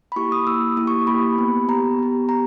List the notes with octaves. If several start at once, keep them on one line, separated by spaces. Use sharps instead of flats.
B5
A#3 E4 G4 C#6
D#6
A#3 E4 G4 E6
A#3 E4 G4 D#6
C#6
A#3 E4 G4 B5
B3 G4
B3 G4 A#5
B3 G4
B3 A#5